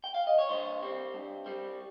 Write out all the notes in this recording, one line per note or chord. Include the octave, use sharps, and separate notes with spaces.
G5
F5
D#5
C#5
G2 C5
G3 C4
G2
G3 C4